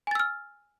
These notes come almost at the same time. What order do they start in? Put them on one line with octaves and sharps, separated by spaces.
G#5 A6 E6 F6